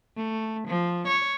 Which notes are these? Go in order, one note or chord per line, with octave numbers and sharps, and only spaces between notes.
A3
F3
C#5